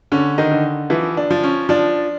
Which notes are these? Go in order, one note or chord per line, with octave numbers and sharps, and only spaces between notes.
D3 C#4
D#3 D#4
D3
E3 F3 E4
D4
F3
C#4
F3 D4